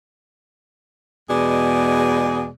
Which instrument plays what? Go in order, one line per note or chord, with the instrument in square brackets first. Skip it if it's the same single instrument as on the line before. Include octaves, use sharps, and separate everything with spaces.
[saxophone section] E2 B2 G#3 D5